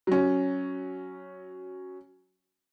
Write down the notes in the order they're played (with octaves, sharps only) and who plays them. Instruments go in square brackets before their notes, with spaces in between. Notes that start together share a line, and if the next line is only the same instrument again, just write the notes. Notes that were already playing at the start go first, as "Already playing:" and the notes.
[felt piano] F#3 C#4